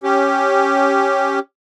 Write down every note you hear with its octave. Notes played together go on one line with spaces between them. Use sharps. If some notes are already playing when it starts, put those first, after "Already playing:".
C#4 G4